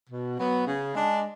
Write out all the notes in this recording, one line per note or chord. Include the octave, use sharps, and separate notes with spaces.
B2
F#3 B3
C#3
G#3 D4